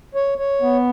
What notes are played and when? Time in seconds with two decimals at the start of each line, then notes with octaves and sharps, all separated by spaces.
0.15 C#5
0.38 C#5
0.62 B3